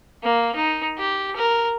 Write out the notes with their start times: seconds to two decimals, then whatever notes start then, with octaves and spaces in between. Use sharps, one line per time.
0.23 A#3
0.56 D#4
0.98 G4
1.36 A#4